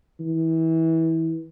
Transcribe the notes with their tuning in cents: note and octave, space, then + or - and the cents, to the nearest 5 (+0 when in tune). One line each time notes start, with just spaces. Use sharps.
E3 -25